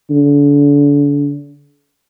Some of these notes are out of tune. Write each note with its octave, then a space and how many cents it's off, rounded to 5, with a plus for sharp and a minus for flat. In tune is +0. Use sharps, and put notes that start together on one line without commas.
D3 -35